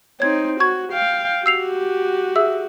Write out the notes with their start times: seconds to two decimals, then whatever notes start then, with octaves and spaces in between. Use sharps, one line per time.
0.20 C4 D#4 C#5 G#6
0.60 F#4 C#6 G#6
0.93 F5 G5
1.46 F#4 G4 E6 C7 F7
2.36 G#4 E5 E6